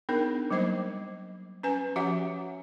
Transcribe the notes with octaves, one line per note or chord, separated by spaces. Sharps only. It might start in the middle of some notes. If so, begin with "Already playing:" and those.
B3 D4 D#4 G#4 A#4
F#3 G3 A#3 C5 D#5
C#4 B4 G#5
F3 C#4 F#4 G4 E5 F#5